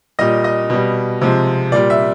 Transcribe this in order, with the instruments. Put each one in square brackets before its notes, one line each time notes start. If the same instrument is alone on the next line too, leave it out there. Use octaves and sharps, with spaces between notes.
[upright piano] A#2 G3 D#5
D#5
B2 G3
C3 F3 G#3
A#2 G3 D5
E5